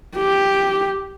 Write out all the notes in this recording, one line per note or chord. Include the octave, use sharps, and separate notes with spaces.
G4